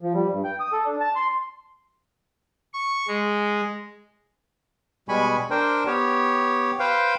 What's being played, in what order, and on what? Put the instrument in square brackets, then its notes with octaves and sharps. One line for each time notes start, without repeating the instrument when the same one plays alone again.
[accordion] F3
G3
G2
G5
D#6
A4
D4
A5
C6
[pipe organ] C#6
G#3
[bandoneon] B2 G3 G#3 G#5 B5 C#6
D4 A#4 C5 G5
B3 G4 C#5
B4 C5 F5 G5